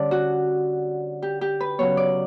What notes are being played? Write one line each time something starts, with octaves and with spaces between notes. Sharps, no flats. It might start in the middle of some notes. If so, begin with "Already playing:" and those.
Already playing: D3 G3 C#4 D5 A5
F#4
G4
G4
B4
C#3 F#3 B3 C#5
D5